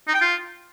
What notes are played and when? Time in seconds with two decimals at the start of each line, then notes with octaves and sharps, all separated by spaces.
0.07 D#4
0.14 G5
0.21 F4